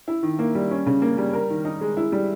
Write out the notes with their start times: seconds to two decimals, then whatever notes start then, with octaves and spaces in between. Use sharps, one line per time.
0.08 E4
0.23 D#3
0.39 A#3
0.55 G3
0.71 C#4
0.86 C#3
1.02 A#3
1.18 G3
1.33 A#4
1.50 D#3
1.65 D#4
1.81 G#3
1.97 E4
2.12 G3